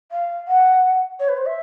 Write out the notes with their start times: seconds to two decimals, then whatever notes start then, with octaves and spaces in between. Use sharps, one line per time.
0.12 F5
0.48 F#5
1.20 C#5
1.29 B4
1.38 C5
1.47 E5